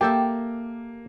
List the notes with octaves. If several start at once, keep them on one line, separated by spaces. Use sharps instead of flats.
A#3 G4 A4 E5 G5